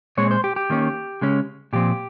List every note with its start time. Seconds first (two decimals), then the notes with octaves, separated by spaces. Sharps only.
0.17 A#2 G#3 C4 C#5
0.31 C5
0.44 G4
0.56 G4
0.70 D#3 A#3 C#4
1.22 C#3 G#3 C#4
1.73 A#2 F3 C4 G4